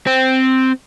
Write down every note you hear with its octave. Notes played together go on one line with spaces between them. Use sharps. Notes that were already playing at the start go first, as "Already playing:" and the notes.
C4